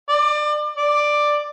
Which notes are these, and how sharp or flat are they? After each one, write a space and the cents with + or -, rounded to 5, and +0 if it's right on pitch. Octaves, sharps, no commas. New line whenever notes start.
D5 +30
D5 +10